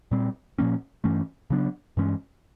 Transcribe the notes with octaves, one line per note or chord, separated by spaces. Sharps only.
A#2 G3 C4
A#2 F3 A#3 C#4
G2 E3 A3 C#4
C#3 F#3 B3 D4
G2 E3 G#3 C#4